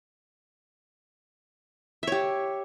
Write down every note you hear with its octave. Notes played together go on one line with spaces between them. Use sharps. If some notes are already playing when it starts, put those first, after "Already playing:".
G4 C#5 E5